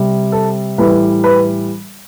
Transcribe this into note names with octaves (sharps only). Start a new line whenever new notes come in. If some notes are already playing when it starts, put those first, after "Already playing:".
Already playing: C3 G3
A4
A2 E3 G3 B4
B4